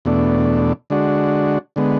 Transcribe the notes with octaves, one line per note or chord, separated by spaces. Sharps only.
E2 B2 A3 D4
D3 G#3 D4 F#4
D3 G#3 B3